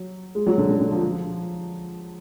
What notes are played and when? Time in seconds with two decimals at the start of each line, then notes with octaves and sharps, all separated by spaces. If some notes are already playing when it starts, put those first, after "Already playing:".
Already playing: F#3
0.35 G#3
0.47 F#3
0.58 D3
0.69 D3
0.80 D3
0.92 F3
1.03 F3